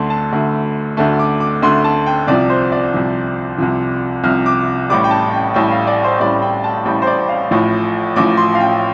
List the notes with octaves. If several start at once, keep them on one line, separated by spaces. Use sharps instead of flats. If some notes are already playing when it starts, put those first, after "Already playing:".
Already playing: D2 D3 A3 A5 C6
A5
D2 D3 A3
D2 D3 A3 A5
D6
D6
D2 D3 A3 C6
A5
G5
C2 C3 F3 D5
C5
D5
C2 C3 F3
C2 C3 F3
C2 C3 F3 F6
D6
A1 A2 G3 D6
G5
A5
G5
A1 A2 G3 G5
F5
D5
C5
A1 A2 G3 D5
G5
A5
A1 A2 G3 G5
C5
D5
F5
A1 A2 F3
A1 A2 F3 D6
C6
F5
G5